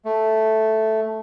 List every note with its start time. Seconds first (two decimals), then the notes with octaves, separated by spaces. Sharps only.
0.05 A3